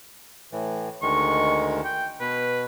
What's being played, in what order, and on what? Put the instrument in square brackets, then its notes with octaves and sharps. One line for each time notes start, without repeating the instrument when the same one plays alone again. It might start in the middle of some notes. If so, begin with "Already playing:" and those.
[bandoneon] A2 E3
[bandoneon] D2 D#3 G#3 [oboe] C#6
[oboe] G5
[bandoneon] B2 [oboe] B4